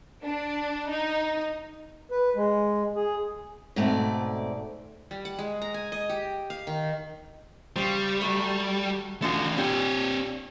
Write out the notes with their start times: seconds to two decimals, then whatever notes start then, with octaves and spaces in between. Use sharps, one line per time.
0.23 D4
0.90 D#4
2.11 B4
2.36 G#3
2.96 G#4
3.76 G#2 B2 A3 C4 D5
5.11 G3
5.25 F#5
5.39 G#3
5.62 A#5
5.74 G#5
5.92 D#5
6.09 G4
6.50 F5
6.67 D#3
7.76 C#3 G3 C5
8.22 F#3 A3
9.22 D3 F3 A3 C#4 F#4
9.57 A#2 C4 D4 G4 C#5